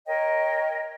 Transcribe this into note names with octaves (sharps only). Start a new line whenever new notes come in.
A#4 C#5 D#5 G5